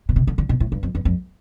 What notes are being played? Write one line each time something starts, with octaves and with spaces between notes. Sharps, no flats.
B2
C3
D3
D3
B2
A2
G2
F2
E2
F2